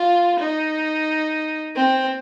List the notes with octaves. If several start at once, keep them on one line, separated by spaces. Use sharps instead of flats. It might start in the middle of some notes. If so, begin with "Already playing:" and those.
Already playing: F4
D#4
C4